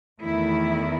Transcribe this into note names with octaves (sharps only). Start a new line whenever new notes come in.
E2 D#3 A3 E4